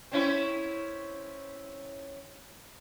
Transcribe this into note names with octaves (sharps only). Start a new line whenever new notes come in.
C4 C#4 E4